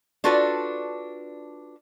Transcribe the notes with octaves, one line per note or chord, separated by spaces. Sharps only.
D4 F4 F#4 A4 B4 D5